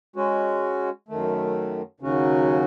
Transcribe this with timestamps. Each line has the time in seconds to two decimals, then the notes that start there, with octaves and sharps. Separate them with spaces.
0.16 G#3 C#4 F#4
1.08 F#2 D#3 A3
2.00 D#2 C#3 F#3 C#4 F#4